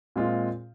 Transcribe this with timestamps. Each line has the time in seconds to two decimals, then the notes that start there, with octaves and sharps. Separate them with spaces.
0.16 A#2 G#3 C4 F4